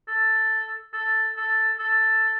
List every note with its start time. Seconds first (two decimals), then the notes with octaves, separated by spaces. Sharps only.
0.08 A4
0.93 A4
1.37 A4
1.79 A4